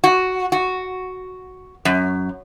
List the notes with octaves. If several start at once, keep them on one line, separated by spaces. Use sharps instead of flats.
F#4
F#4
F#2